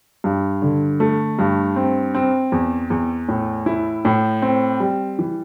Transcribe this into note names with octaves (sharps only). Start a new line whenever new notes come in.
G2
D3
A3
G2
C4
C4
E2
E2
A2
E4
A2
C4
G3
E3